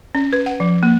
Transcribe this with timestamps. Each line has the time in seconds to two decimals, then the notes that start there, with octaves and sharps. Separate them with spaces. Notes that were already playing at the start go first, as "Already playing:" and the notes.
0.15 C#4
0.33 B4
0.46 F#5
0.60 F3
0.83 A#3